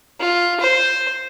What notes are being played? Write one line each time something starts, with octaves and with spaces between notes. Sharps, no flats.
F4
C5